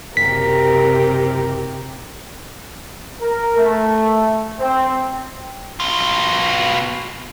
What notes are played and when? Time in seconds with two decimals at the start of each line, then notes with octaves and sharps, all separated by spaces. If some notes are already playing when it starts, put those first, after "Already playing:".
0.17 F#1 C3 G4 A#4 B6
3.21 A#4
3.57 A3
4.60 C4
5.80 B2 F4